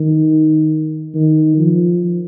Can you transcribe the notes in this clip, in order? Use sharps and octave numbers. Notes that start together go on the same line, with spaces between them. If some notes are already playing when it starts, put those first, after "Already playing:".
Already playing: D#3
D#3
F3